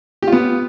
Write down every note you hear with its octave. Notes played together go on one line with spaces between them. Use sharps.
B3 F4 G4